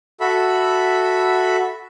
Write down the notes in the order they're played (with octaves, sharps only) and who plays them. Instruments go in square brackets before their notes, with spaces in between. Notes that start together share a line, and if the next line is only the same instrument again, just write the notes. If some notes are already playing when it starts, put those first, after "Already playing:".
[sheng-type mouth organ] F#4 A4 E5 B5